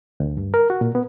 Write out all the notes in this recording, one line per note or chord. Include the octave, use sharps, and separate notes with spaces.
D2
G2
A#4
F#4
A#2
B3